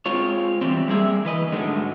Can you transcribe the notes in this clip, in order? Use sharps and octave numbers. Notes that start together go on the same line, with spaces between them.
G#3 C4 F4 C#5
E3 G3 C4
G3 A#3 G#4 E5
E3 B4 D#5
G#2 D3 D#3 F#3 G#3 A3